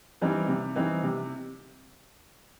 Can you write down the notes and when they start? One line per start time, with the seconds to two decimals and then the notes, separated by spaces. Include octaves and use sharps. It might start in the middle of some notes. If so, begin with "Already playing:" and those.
0.21 E3 G3 C4 D#4
0.48 C3
0.76 E3 G3 C4 D#4
1.03 C3